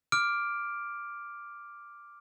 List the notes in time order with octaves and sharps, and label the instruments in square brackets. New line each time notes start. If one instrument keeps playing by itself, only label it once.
[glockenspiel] D6 F6 D7